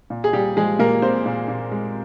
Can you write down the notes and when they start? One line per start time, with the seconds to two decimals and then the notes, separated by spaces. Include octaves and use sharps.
0.10 A#2
0.24 G#4
0.33 A#2 G3 G4
0.56 F3 G#3 G#4
0.79 A#2 A#3 A#4
1.02 A#2 C4 C5
1.26 A#2
1.48 A#2
1.72 G#3